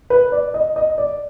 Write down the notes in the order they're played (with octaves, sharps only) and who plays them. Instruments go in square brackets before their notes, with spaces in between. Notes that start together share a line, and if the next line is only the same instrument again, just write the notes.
[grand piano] B4
D5
D#5
D#5
D5